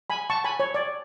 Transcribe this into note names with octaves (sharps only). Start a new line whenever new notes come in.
G#5 B5
A5 C#6
G#5 B5
C#5
D5